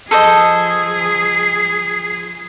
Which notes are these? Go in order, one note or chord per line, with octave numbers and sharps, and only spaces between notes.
F3 G#4 A4 C5 D#5